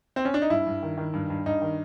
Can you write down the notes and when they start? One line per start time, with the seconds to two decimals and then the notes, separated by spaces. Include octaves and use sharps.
0.16 C4
0.25 C#4
0.34 D4
0.42 D#4
0.50 G2 E4
0.67 G2
0.83 D#3
0.97 D#3
1.14 G2
1.30 G2
1.46 G2 D#4
1.62 D#3